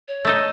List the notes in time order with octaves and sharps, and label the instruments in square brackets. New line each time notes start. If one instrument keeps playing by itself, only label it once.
[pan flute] C#5
[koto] A3 D#4 A4 D#5